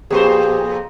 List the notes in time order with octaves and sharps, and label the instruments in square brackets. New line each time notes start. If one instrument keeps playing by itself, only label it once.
[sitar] F2 A#2 C5 [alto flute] G4 [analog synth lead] G#4